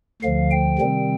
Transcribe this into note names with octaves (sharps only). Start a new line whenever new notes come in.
D2 D3 F3 F5
G5
C3 D#3 G3 C4